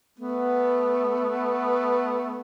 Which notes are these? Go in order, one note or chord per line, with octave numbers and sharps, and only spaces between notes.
A3 B3